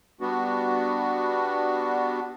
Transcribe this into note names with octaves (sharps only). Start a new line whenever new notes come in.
G3 B3 D4 F#4